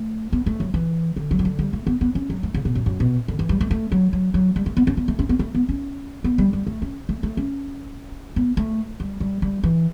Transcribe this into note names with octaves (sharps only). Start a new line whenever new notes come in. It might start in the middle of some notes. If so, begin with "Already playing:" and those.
Already playing: A3
B3
A3
F#3
E3
D3
F#3
E3
D3
G3
A3
B3
B3
C#4
F#3
A3
C#3
B2
F#2
F#2
B2
D3
E3
G3
A3
A3
F#3
F#3
F#3
G3
A3
B3
C#4
B3
A3
C#4
B3
A3
B3
C#4
B3
G3
G3
A3
C#4
A3
A3
C#4
B3
A3
G3
G3
G3
E3